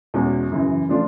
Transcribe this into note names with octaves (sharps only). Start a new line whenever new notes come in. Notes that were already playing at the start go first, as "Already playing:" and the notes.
E2 B2 G#3 C#4 F#4
F#2 C#3 E3
C#3 F3 A3 D4 F4